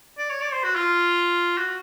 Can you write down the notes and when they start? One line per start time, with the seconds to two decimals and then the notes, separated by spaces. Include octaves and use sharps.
0.18 D5
0.30 C#5
0.41 D5
0.52 C5
0.64 F#4
0.75 F4
1.58 F#4